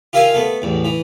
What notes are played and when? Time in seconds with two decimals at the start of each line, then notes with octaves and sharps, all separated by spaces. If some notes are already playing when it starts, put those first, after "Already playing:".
0.13 F4 G4 A#4 E5 F5 G#5
0.34 A3 B3
0.62 A1 E2
0.85 E3